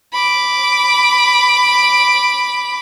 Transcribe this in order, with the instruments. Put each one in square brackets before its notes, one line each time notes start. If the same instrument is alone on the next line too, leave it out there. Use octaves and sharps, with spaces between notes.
[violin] B5 D6